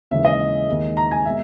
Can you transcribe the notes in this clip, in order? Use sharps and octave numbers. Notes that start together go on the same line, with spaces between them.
D#2 C#3 E3 G#3 E5
D#5
D#2 D#3 G#3
A#5
G#5
B2 G#3 E5